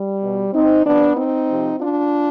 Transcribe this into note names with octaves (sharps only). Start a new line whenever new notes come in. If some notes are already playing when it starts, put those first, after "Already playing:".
Already playing: G3
B2
C4 D#4
C3 F3 B3 D4
C4 D#4
C3 F3
D4 F4